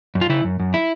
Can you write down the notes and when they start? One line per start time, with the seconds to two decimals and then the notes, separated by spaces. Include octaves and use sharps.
0.15 F#2
0.21 F4
0.29 C#3 E4
0.44 F#2
0.60 F#2
0.74 E4